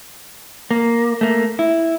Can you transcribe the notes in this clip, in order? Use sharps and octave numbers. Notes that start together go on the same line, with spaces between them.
A#3
A3 A#3
E4